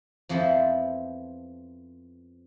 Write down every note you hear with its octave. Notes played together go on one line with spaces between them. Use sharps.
F2 F3 B3 E4 A4 C5